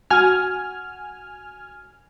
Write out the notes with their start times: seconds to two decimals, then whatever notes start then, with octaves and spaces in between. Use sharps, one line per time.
0.10 F#4 G#5 F6